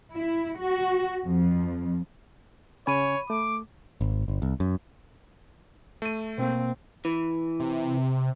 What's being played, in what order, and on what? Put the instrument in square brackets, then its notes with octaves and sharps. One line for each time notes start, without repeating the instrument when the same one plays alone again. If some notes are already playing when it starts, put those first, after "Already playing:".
[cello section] E4
F#4
F2
[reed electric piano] C#3 C#4 G#5 [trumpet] C#5 [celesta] B5 D#7
[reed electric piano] A3 [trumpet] D6
[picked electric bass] G#1
G1
C2
F#2
[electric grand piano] A3 D#7
[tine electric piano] B2 A#3 [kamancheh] C4
[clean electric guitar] E3
[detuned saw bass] C3